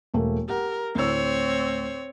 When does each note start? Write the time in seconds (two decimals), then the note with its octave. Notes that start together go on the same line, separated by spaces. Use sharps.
0.14 E1 A3 A#3
0.48 G4 A#4 F#5
0.95 D2 A2 C4 C#5 E6